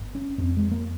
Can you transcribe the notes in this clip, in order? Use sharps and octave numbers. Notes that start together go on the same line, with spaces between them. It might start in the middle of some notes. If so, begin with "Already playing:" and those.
Already playing: G1
C#4
F2 C4
G#3
A#3